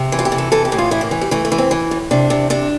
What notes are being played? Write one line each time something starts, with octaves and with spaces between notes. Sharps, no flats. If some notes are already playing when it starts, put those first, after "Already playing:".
Already playing: C3
E3
F4
G4
C3
A4
E3 A4
G4
A2
F4
E3 E4
A#3
E3
G3
E3 A3
A3
E3
C4
E3
A2
C3 D4
C3
C3 D4